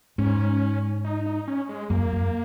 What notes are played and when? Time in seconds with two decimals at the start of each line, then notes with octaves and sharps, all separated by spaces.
0.18 G#2 C#4
1.05 D#4
1.26 D#4
1.48 C#4
1.69 G#3
1.90 F#2 A#3
2.12 F#2